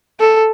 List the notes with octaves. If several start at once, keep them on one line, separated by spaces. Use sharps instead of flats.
A4